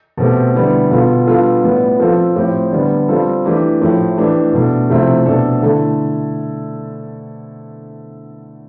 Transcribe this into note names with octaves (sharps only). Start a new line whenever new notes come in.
B2 A3 C4 G4
D3 G3 B3 E4
B2 B3 F4 A4
G3 B3 D4 F4 A4
A2 G3 B3
F3 C4 F4 A4
A2 F3 C4 G4
D3 G3 B3
G3 C4 F4 A4
E3 A3 D4 G4
A2 F3 A3
E3 A3 D4 G4
B2 A3 D4
C3 F3 A3 C4 E4
B2 A3 D4 A4
D3 A3 E4 A4